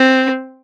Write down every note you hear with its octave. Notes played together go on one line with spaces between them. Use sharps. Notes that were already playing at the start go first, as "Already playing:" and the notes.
Already playing: C4